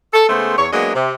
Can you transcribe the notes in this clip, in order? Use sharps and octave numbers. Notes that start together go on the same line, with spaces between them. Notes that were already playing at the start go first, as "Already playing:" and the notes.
A4
C#3 G#3 A3 B3 C5
E2 C#5
F#3 G#3 A#3 B3 D4 D#5
C3